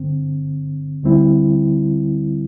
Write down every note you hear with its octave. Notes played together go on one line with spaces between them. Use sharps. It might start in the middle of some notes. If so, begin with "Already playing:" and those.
Already playing: G2 D3 C4
D2 D3 G3 C4 E4